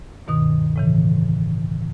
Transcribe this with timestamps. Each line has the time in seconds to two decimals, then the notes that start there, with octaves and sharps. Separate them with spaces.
0.27 D2 G2 B2 D#3 D#6
0.76 A2 C#3 E3